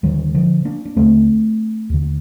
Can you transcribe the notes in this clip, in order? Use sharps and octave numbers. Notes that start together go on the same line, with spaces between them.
D#2 D3 D#3 G3
D3 F3
A#3 D4
D4
D#2 D3 A3 C4
D#2 D3